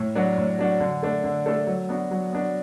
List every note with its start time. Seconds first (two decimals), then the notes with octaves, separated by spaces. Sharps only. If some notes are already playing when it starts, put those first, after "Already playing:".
Already playing: A2
0.15 F#3 D4 F#4
0.38 A2
0.59 F#3 D4 F#4
0.80 D3
1.03 A3 D4 A4
1.24 D3
1.46 A3 D4 A4
1.67 F#3
1.89 B3 D4 F#4
2.11 F#3
2.32 B3 D4 F#4